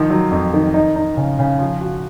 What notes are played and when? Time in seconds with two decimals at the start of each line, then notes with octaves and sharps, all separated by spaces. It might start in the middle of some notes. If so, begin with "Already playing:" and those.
Already playing: D#3 F3
0.10 F#3
0.31 F2
0.54 D#3
0.74 D#4
0.96 D#4
1.17 C#3
1.39 C#3
1.59 F3
1.81 F#4